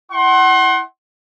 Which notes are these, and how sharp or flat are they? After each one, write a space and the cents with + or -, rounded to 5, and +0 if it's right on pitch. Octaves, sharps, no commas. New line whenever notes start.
E4 +0 F#5 +25 C6 +30